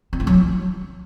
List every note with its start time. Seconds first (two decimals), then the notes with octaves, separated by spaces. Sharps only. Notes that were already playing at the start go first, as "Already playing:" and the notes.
0.13 C4
0.20 A3
0.27 F#3
0.34 E4